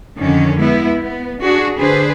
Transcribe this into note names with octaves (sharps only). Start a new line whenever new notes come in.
F2 D3 D#3 C#4
G#3 B3 E4
B3
D4 F#4 G#4
D3 D4 G#4 B4 C5